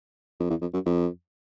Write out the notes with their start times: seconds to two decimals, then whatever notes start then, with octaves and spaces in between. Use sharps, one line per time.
0.40 F2
0.50 E2
0.62 F2
0.74 F#2
0.86 F2